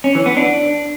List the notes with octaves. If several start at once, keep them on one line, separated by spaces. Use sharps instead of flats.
C#4
E3
B3
D4